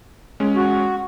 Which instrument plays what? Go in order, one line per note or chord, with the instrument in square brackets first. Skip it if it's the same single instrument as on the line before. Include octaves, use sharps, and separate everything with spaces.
[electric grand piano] G#3 C#4
[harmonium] F#4